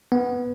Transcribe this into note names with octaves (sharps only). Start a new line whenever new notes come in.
B3